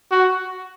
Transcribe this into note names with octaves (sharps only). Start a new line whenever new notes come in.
F#4